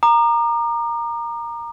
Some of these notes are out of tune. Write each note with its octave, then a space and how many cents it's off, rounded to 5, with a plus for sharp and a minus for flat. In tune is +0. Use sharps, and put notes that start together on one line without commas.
A#5 +0 D6 +45